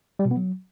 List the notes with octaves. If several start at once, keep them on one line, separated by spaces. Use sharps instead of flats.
G3
B2
B3
F#3